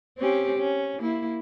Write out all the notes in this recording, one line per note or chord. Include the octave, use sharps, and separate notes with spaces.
C4 C#4 G4
C#4
A#3 E4